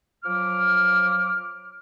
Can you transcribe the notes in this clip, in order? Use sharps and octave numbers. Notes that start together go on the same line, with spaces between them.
F3 F#3 D6 F6